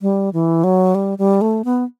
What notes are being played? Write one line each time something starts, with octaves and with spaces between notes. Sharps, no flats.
G3
E3
F#3
G3
G3
A3
B3